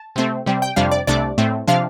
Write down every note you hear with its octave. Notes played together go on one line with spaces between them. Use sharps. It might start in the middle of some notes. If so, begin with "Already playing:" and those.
Already playing: A5
C3 A3 C4
C3 G3 C4
G5
F2 C3 G3 D4 F5
D5
C2 C3 A3 D4 D5
A2 A3 C4
C3 F3 D4 F5